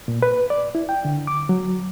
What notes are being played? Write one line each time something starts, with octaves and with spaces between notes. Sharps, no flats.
A#2
B4
D5
E4
G5
D3
D6
F#3